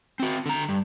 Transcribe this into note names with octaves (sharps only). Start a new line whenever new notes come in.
C4 F#4
D3 A#5
G2